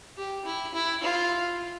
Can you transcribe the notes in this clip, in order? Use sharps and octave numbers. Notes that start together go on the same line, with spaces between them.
G4
E4
E4
F4